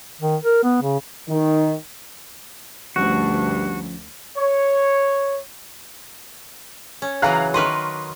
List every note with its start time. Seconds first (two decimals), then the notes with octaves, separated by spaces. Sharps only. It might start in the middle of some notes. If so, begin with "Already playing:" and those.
0.21 D#3
0.43 A#4
0.63 B3
0.82 C#3
1.29 D#3
2.96 D2 G2 F3 C#4 F#4
4.37 C#5
7.02 C#4
7.22 C#3 E3 F#3 F5 A#5 F#6
7.54 D#3 B4 D#5 C6 C#6 F6